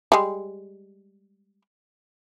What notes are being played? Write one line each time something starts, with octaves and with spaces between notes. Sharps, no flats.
G3 G#3